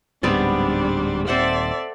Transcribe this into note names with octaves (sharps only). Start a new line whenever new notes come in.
D1 G#2 G3 B3 C4 D4 D5
D#1 D#2 C4 A4 C5 D5 E5 F#5